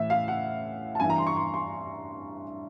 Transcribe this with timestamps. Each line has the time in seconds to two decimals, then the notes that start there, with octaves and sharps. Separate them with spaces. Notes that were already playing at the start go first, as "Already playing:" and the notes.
Already playing: A2 E3 E5
0.10 F5
0.28 F#5
0.95 A5
1.00 G2 E3 G#5
1.10 A#5
1.18 C6
1.27 C#6
1.36 C6
1.54 C6